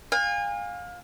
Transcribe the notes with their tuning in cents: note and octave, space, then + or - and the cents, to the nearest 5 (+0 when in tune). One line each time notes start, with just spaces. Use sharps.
F5 +25 G#5 -35